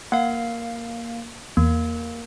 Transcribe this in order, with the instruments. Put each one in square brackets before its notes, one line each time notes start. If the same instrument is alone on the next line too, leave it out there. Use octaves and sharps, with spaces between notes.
[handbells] A#3 F5 [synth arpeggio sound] F#5
[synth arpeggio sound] E2 [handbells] A#3